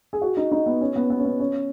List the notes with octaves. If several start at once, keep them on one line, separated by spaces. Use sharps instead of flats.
G#4
F#4
D#4
D#4
B3
C#4
B3
B3
C#4
B3
C#4